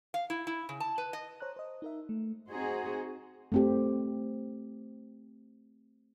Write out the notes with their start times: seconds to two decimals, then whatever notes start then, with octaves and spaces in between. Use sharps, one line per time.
0.14 F5
0.30 E4
0.47 E4
0.69 C#3
0.80 A5
0.98 B4
1.13 D#5
1.40 C5 C#5 A#5 F#6
1.56 C5 D#5
1.82 D#4 A#4 E5
2.09 A3
2.50 C4 D#4 F#4 G#4 C5
3.52 A3 C4 G4